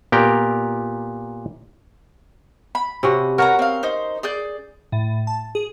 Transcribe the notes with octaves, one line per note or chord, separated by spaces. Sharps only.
A#2 B3 G4 A#4 G5
B5
C3 C#4 F#4
F#4 A#4 B4 C#5 A#5
C4 F5
D#4 C5
G#4 D5 G6
A2
A5
G#4